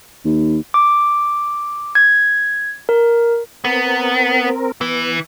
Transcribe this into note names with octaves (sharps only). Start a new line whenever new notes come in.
D#2
D6
G#6
A#4
B3 C4 A#4
E3 B3